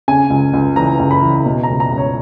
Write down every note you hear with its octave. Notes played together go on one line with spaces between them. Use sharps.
C#3 G#5
C#2
C#2
E3 A#5
C#2
B5
E3
B2
A#5
C#2
A#5
C#2
C#5